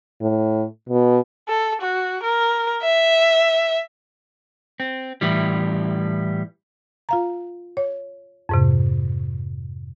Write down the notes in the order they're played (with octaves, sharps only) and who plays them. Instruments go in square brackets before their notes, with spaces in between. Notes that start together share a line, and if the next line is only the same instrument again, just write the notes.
[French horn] A2
B2
[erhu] A4
F#4
A#4
E5
[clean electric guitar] C4
A2 E3 G3
[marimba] F4 F5 A#5
C#5
F2 G#2 C3